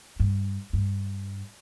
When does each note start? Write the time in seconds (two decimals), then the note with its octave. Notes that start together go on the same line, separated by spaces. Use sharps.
0.20 G2
0.73 G2